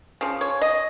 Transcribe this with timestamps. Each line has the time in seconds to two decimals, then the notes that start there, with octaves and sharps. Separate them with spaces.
0.21 C#3 F3
0.41 C#5
0.61 D#5